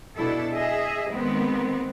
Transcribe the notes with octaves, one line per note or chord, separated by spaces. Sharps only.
B2 D4 E4 A4
G#4 D#5 E5
D#3 G#3 B3 C4